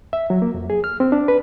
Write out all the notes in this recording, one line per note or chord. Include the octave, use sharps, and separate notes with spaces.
E5
F#3
A#3
F2
G#4
F6
C4
D4
B4